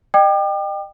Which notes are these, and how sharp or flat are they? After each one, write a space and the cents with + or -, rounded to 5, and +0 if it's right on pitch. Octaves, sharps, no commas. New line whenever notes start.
D#5 -35 G5 +5 D6 +45